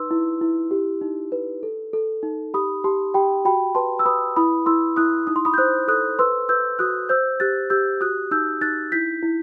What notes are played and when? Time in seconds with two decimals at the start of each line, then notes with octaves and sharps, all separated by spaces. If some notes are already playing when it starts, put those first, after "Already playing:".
Already playing: D#4 B4 C6 E6
0.11 E4
0.41 E4
0.71 G4
1.02 D#4
1.32 B4
1.63 A4
1.93 A4
2.23 D#4
2.54 G4 B5 D#6
2.84 G4 A5 C6
3.14 G4 G5 B5
3.45 F#4 G5 B5
3.75 B4 A5 C6
3.99 E6
4.06 B4 B5 D#6
4.36 E4 B5 D#6
4.66 E4 C6 E6
4.96 E4 D#6 F#6
5.27 D#4 D#6
5.36 C6
5.45 B5 D#6
5.54 G6
5.58 C5 D#6 F#6
5.88 A4 D#6 F#6
6.19 B4 C6 E6
6.49 B4 E6 G6
6.79 F#4 D#6 F#6
7.09 C5 E6 G6
7.40 G4 F#6 A6
7.70 G4 E6 G6
8.01 F#4 D#6 F#6
8.31 D#4 E6 G6
8.61 D#4 F#6 A6
8.92 E4 G6 B6
9.22 E4